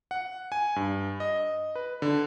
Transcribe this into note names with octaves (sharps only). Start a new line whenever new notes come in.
F#5
G#5
G2
D#5
B4
D3